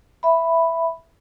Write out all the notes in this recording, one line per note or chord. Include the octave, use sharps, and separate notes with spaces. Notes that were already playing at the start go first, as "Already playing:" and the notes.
E5 B5